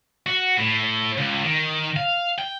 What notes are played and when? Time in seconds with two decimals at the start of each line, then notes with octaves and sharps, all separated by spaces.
0.26 F#4
0.58 A2
1.18 C#2
1.44 D#3
1.96 F5
2.38 G5